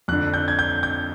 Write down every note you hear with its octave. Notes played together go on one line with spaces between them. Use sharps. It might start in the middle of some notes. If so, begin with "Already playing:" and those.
F2 D3 F#6
G6
G#6
G6
G6